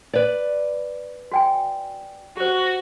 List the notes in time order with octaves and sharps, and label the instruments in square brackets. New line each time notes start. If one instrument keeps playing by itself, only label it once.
[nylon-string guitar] B4 D5
[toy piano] F#4 G5 G#5
[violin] F#4 [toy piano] G4 C5